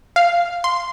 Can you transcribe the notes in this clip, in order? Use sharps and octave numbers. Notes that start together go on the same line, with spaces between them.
F5
C6